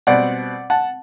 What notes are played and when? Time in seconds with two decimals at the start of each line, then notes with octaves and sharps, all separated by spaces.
0.07 B2 G3 C4 D5 F#5
0.70 F#5 A5